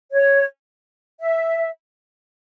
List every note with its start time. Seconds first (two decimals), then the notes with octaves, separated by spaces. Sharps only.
0.12 C#5
1.20 E5